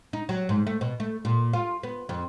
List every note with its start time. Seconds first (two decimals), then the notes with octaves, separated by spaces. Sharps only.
0.13 D#4
0.29 F#3
0.49 G#2
0.67 A3
0.81 B2
1.00 A3
1.25 A#2
1.53 F4
1.83 B3
2.09 F2